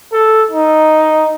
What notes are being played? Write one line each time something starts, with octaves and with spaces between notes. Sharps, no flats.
A4
D#4